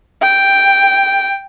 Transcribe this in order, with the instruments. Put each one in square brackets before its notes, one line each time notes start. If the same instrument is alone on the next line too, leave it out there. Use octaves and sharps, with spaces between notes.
[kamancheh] G5